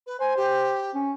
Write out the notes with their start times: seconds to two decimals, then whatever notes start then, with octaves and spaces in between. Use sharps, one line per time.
0.06 B4
0.20 C5 G#5
0.36 G4
0.95 C#4